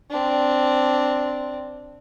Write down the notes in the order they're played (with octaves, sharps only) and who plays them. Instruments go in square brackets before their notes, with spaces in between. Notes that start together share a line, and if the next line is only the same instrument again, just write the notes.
[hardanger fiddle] C4 D4